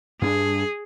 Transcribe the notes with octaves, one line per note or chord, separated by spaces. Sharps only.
G2 C#4 D4 G#4